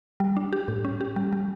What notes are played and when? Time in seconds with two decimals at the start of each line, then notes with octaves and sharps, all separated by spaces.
0.20 G3
0.37 D4
0.53 G4
0.68 A2
0.85 C#4
1.01 G4
1.16 G3
1.33 G3